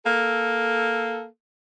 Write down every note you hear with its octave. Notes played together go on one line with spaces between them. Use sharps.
A#3 A4